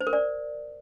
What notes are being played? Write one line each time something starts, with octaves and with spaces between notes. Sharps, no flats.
C5
A#4
D5